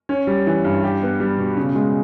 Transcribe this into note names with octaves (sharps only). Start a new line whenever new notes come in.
C#4
G3
E3
G2
G4
B3
G3
B2
C#3
G#3